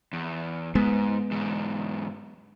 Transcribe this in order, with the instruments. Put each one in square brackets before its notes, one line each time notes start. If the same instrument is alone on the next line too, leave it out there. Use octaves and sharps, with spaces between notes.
[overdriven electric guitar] E2
[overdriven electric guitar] G#2 [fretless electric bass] G#3 B3
[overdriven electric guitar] E2 G#2